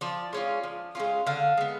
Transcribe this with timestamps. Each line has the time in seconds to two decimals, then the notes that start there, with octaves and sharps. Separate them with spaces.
0.01 F3 D5
0.33 G#3 C#4 F4
0.64 F3
0.95 G#3 C#4 F4
1.27 D3 F5
1.57 G#3 B3